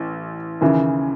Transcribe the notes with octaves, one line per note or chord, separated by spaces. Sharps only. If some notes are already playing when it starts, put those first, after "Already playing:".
Already playing: A1
D#2 C#3 E3